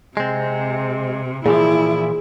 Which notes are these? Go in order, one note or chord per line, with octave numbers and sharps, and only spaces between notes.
C3 G#3 C4
A#2 E3 F3 E4 G#4